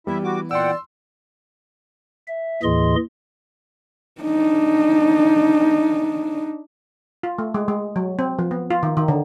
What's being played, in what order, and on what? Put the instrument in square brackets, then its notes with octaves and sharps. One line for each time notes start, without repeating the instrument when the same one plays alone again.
[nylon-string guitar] E3 B3 [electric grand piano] G3 [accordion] E4 E5
[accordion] F#4 D6
[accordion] A#2 F#5 G5 [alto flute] D5 [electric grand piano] C6 E6
[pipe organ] E5
D#2 A2 E3 G#4 D#5 C6
[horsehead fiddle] D4 D#4
[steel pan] F4
A3
G#3
G#3
F#3
C4
F3
B3
F4
D#3
D#3
D3